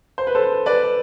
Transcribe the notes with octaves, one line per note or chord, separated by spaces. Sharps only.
C5
B4
A4 C5
B4 D5